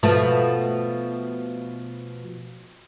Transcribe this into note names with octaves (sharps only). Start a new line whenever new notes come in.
B2 F3 A3